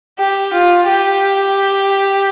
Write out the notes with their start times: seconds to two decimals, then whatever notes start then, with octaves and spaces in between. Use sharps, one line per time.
0.19 G4
0.53 F4
0.88 G4